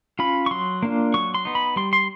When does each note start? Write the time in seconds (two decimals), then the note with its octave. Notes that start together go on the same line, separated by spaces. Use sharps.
0.19 C#4 F4 B5
0.46 C#6
0.51 F#3 C6
0.82 A#3 D4 F4
1.14 F#3 C#6
1.34 C6
1.45 B3 D#4
1.55 B5
1.76 G3 C6
1.93 C6